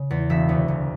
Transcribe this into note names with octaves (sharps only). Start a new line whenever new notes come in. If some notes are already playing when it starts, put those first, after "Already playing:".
Already playing: C#3
E2
E1 E5
D2
E1